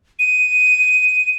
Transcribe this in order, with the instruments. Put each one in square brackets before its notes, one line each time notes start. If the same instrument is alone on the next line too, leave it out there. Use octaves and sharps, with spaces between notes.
[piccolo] D#7